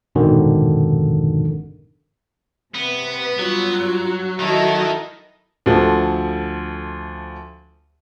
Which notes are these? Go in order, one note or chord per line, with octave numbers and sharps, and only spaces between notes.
A#1 F2 G#2 B2 D3 D#3
C3 B3 B4
G2 F#3 F4
D#3 E4 F#4 A4 D#5
D2 F3 A4